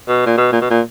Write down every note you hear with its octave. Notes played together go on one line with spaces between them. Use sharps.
B2
A#2
B2
A#2
B2
A#2